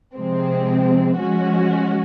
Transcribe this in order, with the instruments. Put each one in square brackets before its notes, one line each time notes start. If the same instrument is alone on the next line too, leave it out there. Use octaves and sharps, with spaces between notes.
[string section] C3 F3 G#3 C4
F3 G#3 C#4 F#4